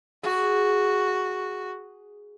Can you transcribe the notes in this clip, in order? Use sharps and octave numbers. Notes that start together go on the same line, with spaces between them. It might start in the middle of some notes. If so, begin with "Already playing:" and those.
F#4 G#4